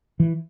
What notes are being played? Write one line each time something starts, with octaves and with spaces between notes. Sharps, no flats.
E3